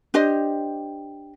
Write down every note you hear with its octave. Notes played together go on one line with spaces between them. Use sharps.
D4 G4 C5 D#5